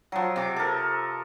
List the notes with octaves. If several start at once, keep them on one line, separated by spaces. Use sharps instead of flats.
F3 F#3
C3 D6
A4 A#4